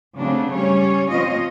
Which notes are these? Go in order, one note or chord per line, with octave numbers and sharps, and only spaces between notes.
C#3 F#3 A3 C4 D4
G3 C#4 C#5
F3 C4 F4 C#5 D#5